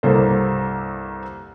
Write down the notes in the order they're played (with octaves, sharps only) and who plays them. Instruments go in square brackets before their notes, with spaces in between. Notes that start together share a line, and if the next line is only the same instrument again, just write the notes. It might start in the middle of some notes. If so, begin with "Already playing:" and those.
[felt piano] C2 G2 A#3 A4 C5